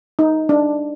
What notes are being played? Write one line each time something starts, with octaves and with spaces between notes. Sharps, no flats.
D#4
D4